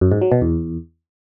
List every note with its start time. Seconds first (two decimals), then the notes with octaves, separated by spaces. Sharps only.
0.01 F#2
0.11 G#2
0.21 F#3
0.32 B2
0.42 E2